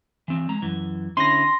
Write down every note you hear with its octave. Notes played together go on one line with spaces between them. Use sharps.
E3 C4
G#3 A#5
F#2 E3
D3 C#4 E4 C6 A#6